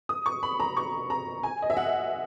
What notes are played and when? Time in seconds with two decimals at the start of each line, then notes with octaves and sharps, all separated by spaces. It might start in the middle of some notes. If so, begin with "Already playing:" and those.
0.09 D#6
0.26 C#6
0.43 B5
0.60 A#5
0.77 C#6
1.10 A#5
1.43 G#5
1.62 D#5
1.70 E5
1.77 F#5